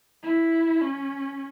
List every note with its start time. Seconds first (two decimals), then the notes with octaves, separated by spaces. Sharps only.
0.23 E4
0.82 C#4